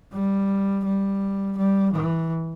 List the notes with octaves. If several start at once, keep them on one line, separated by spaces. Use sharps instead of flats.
G3
G3
G3
E3